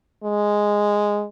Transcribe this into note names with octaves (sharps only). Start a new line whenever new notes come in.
G#3